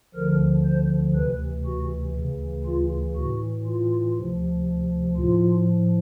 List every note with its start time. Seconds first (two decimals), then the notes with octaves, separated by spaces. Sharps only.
0.15 D2 D3 F3 A#4
0.65 C5
1.15 D2 C3 E3 B4
1.66 F#4
2.16 D2 C#3 E3
2.66 F4
3.16 A2 E3 F#4
3.66 F4
4.16 D2 C3 F3
5.16 A2 F3 F4